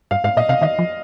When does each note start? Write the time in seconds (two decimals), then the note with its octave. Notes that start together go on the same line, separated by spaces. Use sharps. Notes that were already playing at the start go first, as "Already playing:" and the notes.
0.11 G2 F5
0.24 G#2 F5
0.37 A#2 D#5
0.49 C3 F5
0.61 D#3 D#5
0.79 F3